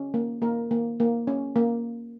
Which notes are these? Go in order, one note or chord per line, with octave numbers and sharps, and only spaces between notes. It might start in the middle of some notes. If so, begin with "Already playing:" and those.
Already playing: C#4
A#3
A#3 A#4
A#3
A#3
C#4
A#3